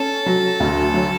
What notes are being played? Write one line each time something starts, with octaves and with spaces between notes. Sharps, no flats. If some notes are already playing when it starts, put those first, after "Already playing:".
Already playing: C#4 A4
F#3
D2
F#3